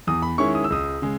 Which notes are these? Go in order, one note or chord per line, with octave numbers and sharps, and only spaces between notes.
E2 D#6
B5
D#3 G#3 C#4 E4 C#6
D#6
E6
C#2 D#6
C#3 G#3